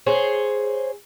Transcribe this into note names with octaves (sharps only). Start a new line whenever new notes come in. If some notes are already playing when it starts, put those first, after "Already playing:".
G#4 C5 C#5